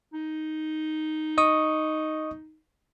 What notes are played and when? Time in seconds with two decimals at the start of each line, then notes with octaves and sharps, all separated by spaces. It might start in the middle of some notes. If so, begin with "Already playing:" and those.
0.13 D#4
1.38 D#5 C#6 D#6